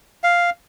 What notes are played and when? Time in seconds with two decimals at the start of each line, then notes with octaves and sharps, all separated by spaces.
0.24 F5